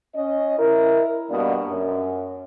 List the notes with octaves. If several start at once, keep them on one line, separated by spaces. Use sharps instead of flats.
C#4 D#5
E4 A#4
G2 B2 G3 A#3 D4
F#2